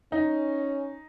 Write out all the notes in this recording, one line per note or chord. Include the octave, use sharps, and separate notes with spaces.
C#4 D#4